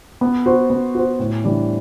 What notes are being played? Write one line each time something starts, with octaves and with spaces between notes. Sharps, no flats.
B3
F#4 C5
B3
F#4 C5
A2
E3 G3 D4